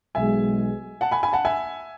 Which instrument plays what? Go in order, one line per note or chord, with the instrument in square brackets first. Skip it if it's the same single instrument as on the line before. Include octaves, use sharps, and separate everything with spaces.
[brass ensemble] B1 B2 G#3 [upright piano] E5 G#5
[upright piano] F#5 A5
G#5 B5
G#5 B5
F#5 A5
E5 G#5